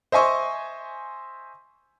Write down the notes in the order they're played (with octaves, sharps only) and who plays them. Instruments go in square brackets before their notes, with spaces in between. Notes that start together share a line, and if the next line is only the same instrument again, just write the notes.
[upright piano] C5 D#5 E5 G#5 C6 C#6